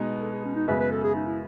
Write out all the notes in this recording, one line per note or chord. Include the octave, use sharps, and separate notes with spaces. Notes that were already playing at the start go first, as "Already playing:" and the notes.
Already playing: B2 G#3 B3 D#4
A4
G#4
C#4
D#4
F#2 C#3 G#3 B3 B4
B4
A4
G#4
D#4
E4